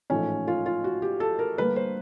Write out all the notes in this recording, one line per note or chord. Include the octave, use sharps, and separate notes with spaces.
A1 G#2 F3 A3 C#4
F4
F4
F#4
G4
A4
A#4
D2 D3 G3 A#3 B4
C5